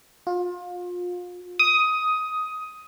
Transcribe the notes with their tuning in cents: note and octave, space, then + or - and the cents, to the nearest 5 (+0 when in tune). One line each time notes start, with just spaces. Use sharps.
F4 +30
D#6 +10